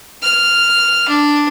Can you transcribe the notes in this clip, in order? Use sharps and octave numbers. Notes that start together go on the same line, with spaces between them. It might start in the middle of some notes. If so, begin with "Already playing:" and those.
F6
D4